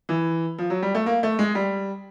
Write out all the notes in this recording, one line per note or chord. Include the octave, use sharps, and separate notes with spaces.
E3
F3
F#3
G3
A3
A#3
A3
G#3
G3